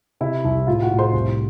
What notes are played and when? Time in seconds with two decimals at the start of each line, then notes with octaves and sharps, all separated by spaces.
0.21 C3 E4 E5
0.45 C2
0.67 A2 F4 F5
0.82 F#4 F#5
0.90 A2
0.99 C5 C6
1.13 C2